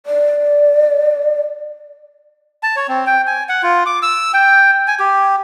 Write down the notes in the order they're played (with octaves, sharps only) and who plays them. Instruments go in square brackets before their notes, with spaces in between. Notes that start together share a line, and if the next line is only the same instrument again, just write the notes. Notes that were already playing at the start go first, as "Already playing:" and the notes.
[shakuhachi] D5
[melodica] A5
C#5
C4
G5
G#5
F#5
F4
D6
E6
G5
G#5
G4